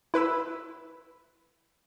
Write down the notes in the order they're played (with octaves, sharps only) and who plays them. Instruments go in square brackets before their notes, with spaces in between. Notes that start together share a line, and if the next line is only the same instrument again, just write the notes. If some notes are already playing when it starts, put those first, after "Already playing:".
[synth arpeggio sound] E4 B4 B5 E6